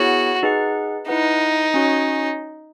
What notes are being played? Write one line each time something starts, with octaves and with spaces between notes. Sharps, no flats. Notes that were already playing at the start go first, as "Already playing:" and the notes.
Already playing: B3 E4 F#4 G#4 C#5 F#5
D#4 G#4 B4 F#5
D#4 E4 B4 F#5
C#4 F#4 C#5